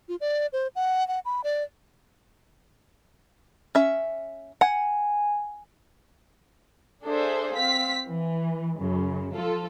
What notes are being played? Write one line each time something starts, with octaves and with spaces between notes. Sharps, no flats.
F4
D5
C5
F#5
F#5
B5
D5
C#4 E5
F#5 G#5
D4 G#4 A4 C5 E5
C4 F5 B6
E3
F#2 C#3
F3 F4 A4